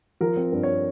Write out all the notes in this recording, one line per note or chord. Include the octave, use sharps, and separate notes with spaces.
F3 A#4
C4
G2
C#5